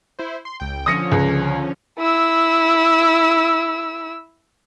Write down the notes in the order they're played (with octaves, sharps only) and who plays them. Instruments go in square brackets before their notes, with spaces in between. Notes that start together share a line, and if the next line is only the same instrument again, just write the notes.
[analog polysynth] E4 C5
C6
C#2 G5
[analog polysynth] D3 F3 C#4 [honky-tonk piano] D#6 A#6 C#7
[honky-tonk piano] C#2
[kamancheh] E4 E6